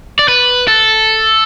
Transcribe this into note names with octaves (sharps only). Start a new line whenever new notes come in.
D5
B4
A4